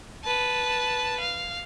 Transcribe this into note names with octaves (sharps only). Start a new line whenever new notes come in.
B4 A5
F5